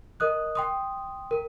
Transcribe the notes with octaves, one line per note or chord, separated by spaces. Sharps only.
A#4 D#5 D#6 F#6
G5 C6 D#6
A#4